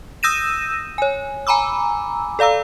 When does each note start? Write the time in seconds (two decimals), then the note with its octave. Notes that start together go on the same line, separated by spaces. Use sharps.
0.23 D#6 E6 G6 A#6 D#7 E7
0.98 C#5 G#5
1.47 G#5 A#5 B5 D6 E6
2.39 A4 D5 F5 A#5 E6